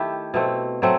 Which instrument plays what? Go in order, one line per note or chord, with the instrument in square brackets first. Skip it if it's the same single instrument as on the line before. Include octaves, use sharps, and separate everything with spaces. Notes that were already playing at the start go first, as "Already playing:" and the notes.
Already playing: [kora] D#3 A3 E4 G4
B2 A3 C4
F#3 A3 C4